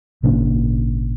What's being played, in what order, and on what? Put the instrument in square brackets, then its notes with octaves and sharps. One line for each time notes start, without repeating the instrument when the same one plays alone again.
[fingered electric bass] G#1 A#2 C#3 D4